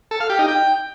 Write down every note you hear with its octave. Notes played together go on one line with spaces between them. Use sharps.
A4
F5
G4
D#4
G5